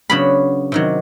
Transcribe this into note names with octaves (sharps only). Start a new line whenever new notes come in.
C#3 F#3 B3 D4 B5
C3 D#3 F#3